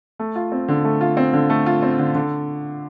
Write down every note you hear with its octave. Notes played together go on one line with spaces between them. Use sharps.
A3
F4
C4
D3
A3
F4
C4
D3
A3
F4
C4
D3
D3